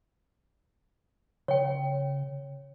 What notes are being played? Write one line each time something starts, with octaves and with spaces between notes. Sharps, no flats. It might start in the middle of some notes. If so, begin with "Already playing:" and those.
C#3 C#5 G5